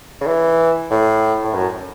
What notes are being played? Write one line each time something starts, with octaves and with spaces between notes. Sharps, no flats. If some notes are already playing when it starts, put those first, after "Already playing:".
C#3
E3
A2
A2
F#2